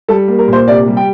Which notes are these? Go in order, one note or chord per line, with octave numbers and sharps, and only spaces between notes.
G3 A4
A#3
A#4
A#2 C5
C3 D5
G3
G5